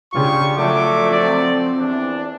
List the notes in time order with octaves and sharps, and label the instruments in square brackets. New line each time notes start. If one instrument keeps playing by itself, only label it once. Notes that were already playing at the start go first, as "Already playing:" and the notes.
[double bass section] C#3 [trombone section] D4 F4 G4 [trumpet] C#6
[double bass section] F3 [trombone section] F#3 A3 [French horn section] F4 D5 [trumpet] D6
[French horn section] C4 [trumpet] D5
[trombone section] E2 [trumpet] D4